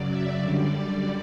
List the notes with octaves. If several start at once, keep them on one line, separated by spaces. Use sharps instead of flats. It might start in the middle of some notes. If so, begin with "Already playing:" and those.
Already playing: F#2 C#3 F#3 D5
E5
F#2 D3 G3 D5